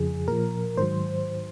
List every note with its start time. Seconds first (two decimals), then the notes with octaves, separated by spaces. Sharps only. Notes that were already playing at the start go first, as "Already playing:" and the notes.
Already playing: F2 C#3 F3 G#4
0.28 A#2 F3 A#4
0.77 G#2 D#3 F#3 C5